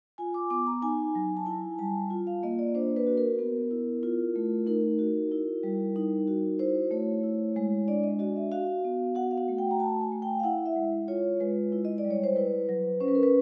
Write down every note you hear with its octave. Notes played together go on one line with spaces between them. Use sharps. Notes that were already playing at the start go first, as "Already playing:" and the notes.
F4 G#5
D6
B3 D6
A#5
D#4 G#5
F#3
A5
E4 G#5
G3 A5
F4
F5
A#3 D#5
D5
D4 C5
B4
F#4
A#4
B3
E4
F4
A3
D#4 A#4
F#4
E4
G3
D#4
F#4
E4 C5
A3 C#5
E4
G#3
D4 D5
D#5
F#4 D#5
E5
F#4 F5
B3
F#4 F#5
F5
F#5
A3
G5
A#5
F#4 A5
G#5
A3
G5
F5
E4 F#5
E5
G#3
F4 C#5
G#3 B4
E4
D#5
D5
G3
C#5
C5
E4 B4
F#3
C#4 C5
B4
A#4
B4